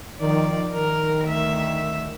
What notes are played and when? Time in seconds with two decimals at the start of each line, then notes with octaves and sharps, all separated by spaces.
0.20 D#3 F3 D5
0.74 D#3 A#4
1.28 D2 E5